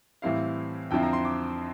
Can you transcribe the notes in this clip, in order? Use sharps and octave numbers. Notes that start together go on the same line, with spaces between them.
A2 E3 G3 C4 E4 F5
F2 D3 F3 C4 E4 G5
A#5
C6
D6